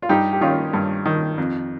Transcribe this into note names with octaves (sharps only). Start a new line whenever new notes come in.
F4
G2 D#4 G4
G4
D#3 C#4 F4
G2
D#3
F2